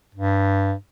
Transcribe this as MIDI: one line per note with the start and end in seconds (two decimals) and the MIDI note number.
0.15 0.74 43